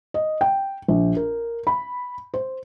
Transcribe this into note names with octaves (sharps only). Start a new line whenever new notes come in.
D#5
G5
A#1
A#4
B5
C5